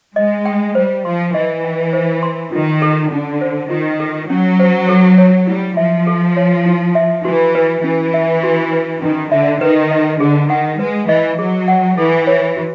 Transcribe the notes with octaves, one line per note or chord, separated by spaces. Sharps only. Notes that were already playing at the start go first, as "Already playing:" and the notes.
G#3 D#5
G5
G3 C5
F3 C6
E3 D#5
G5
C5
C6
D#3 F4
A4
D3 C#4
C5
D#3 F4
A4
F#3 C#4
C5
A4
C#5
G3 E4
F3 E5
A4
C#5
E4
E5
E3 F#4
B4
E3 C#4
E5
F#4
B4
D#3 C#4
D3 E5
D#3 B4
D#5
D3 G#4
D#3 F#5
G#3 B4
E3 D#5
F#3 G#4
F#5
E3 A4
C#5
F#4